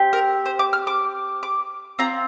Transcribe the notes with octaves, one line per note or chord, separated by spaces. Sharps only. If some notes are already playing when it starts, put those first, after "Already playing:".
Already playing: C4 G4
A#4
C5
D6
F6
D6
D6
C4 F4 A#5